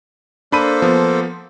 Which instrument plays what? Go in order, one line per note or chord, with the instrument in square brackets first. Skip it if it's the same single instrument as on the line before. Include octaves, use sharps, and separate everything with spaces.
[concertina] A#3 A4 C5 [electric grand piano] D4 B5 D#7
[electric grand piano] F3 B3